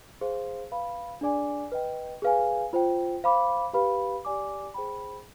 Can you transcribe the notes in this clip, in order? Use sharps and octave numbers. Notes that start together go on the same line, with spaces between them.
G#4 C5 F5 C6
B4 F5 B5
D4 G#4 D5 G#5 D6
B4 D#5 G5
G#4 B4 F5 G#5
F4 C5 G5
C5 F5 B5 D6
G4 B4 F5 B5
G4 D5 G#5 D6
G#4 C5 G5 B5